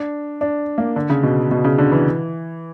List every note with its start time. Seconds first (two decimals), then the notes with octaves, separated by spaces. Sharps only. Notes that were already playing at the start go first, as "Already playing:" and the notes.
Already playing: D4
0.41 D4
0.78 A#3
0.96 D3
1.10 C#3
1.23 B2
1.51 B2
1.64 C#3
1.78 D3
1.92 E3